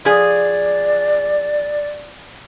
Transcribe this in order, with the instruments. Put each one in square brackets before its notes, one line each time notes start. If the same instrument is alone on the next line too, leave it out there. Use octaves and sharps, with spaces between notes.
[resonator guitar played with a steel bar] F3 G#4 [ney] D5